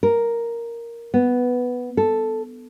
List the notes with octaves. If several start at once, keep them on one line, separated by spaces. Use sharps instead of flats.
A#4
B3
A4